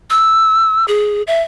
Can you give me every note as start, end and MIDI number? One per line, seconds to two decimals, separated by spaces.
0.10 0.85 88
0.88 1.22 68
1.27 1.41 76